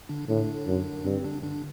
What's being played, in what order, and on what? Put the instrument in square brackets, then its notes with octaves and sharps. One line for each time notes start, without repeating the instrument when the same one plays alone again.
[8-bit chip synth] D3 D4
[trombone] A2 [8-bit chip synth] D3 D4
[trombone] F#2
[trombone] G2 [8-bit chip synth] C4
[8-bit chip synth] D3 D4
D3 D4